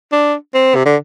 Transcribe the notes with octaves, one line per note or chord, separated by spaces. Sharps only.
D4
C4
C3
D3